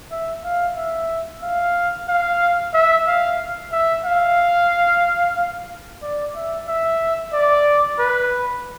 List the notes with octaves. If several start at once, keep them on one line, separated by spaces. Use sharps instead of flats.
E5
F5
E5
F5
F5
E5
F5
E5
F5
D5
E5
E5
D5
B4